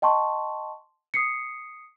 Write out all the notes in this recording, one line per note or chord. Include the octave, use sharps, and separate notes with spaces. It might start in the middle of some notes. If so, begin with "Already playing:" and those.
D#5 G5 A5 C6 C#6
D#6 C7 C#7